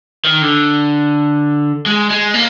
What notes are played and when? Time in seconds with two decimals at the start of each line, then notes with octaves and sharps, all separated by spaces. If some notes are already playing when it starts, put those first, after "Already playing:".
0.25 D#3
0.42 D3
1.86 G#3
2.10 G#3
2.34 A#3